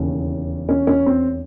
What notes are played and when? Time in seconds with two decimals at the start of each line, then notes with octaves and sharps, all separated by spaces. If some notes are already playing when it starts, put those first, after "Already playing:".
Already playing: E1 D#2 C#3 E3 C#4
0.69 C#4
0.87 C#4
1.06 C4